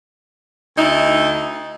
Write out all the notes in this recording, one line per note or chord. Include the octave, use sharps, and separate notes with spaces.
D2 D#4 E4